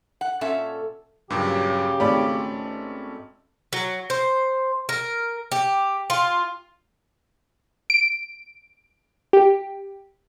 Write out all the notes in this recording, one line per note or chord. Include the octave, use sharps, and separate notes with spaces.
F#5
A#2 C#4 A4 E5
G2 A#2 C#3 F#3 G4
G#1 A3 C#4 D5 B5
F#3
C5
A#4
G4
F4
D7
G4